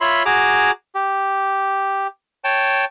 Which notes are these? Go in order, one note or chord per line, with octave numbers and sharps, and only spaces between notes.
F4 C#5 E5 B5 C6
F#4 G#4 A#5 D6
G4
C#5 G5 A5